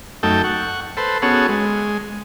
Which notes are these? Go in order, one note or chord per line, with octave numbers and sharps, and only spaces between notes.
F#2 A3 D#4 A4 G5
F#5 C#6
A4 B4 C5
B3 C#4 F#4 G#4 A4 C#5
G#3